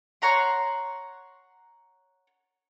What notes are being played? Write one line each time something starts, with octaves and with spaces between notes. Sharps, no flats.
C#5 F#5 A#5 C6